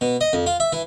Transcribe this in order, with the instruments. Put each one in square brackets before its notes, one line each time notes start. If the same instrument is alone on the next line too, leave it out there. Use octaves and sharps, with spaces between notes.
[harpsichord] B2
D#5
F2
F4
E5
E3